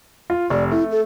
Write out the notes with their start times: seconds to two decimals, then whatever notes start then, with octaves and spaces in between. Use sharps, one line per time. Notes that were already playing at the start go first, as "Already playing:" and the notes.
0.30 F4
0.50 F1 D5
0.71 A3 E4
0.91 A4